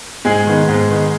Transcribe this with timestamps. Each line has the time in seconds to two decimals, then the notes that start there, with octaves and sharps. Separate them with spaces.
0.25 G#2 G#3 G#4
0.47 D#3 B3 D#4
0.69 G#2
0.90 D#3 B3 D#4